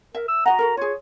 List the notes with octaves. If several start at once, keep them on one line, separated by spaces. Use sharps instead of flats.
A#4 E5
E6
F#4 D#5 F#5 A#5
F#4 A4 A#4
F4 G#4 C#5